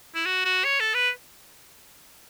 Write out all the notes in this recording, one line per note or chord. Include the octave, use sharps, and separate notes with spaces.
E4
F#4
F#4
C#5
A4
B4